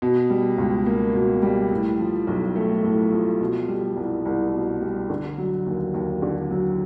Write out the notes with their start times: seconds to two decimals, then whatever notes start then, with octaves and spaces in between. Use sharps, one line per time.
0.02 B2
0.30 G3
0.58 C#2
0.86 A#3
1.14 B2
1.42 G3
1.71 A2
1.99 F3
2.27 B1
2.56 A3
2.84 A2
3.12 F3
3.40 B2
3.68 G3
3.96 C2
4.25 C2
4.53 B2
4.81 G3
5.10 D3
5.38 F#3
5.66 D#2
5.94 D#2
6.22 D3
6.51 F#3